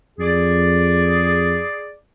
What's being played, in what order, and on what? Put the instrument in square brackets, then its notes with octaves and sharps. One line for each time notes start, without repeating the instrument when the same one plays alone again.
[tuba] F2 [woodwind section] G#4 D5